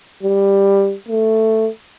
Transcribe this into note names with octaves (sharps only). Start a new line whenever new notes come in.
G3
A3